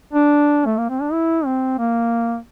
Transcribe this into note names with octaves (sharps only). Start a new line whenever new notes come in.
D4
A3
A#3
C4
D4
E4
C4
A#3